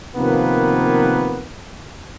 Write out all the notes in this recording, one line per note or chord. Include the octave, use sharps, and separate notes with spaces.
C3 D#3 F3 A#3 B3 B4